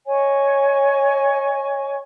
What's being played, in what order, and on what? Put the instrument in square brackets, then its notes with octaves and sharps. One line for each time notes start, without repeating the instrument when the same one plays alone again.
[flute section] C#5 D#5 G#5 C#6